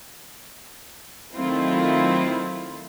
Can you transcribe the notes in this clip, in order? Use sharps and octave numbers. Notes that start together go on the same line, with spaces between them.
D#3 F#3 A3 C4 E4 F4